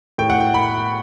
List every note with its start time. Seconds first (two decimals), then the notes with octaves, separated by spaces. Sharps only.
0.18 A2 G5
0.30 F#5
0.40 G5
0.54 B5